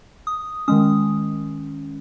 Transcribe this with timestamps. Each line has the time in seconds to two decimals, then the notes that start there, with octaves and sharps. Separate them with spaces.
0.27 D#6
0.68 D#3 G#3 C#4 D#6